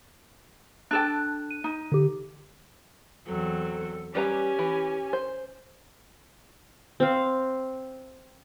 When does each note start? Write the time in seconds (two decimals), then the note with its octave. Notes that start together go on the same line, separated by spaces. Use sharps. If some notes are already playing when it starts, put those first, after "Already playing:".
0.91 D4 A4 G5 F#6
1.51 D#7
1.64 D#4
1.92 D3 G4
3.27 E2 F#3 C4 A4
4.15 G3 C#4 G4 B4 G#5 A#5
4.59 E3
5.13 C5
7.00 C4 F5